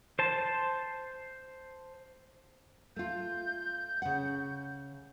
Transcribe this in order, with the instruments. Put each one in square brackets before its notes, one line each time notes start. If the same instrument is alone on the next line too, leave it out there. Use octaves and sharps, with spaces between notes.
[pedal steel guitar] C5 A5
[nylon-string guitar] A3 F4 [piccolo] G6
[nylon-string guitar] C#3 F#5